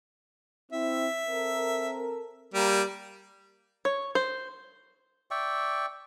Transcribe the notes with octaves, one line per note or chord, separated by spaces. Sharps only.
C4 E4 E5
C4 A4 A#4
G3 A#3
C#5
C5
D5 E5 G5 C#6